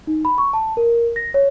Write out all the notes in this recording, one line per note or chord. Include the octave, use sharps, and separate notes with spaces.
D#4
B5
C#6
A5
A#4
A#6
C#5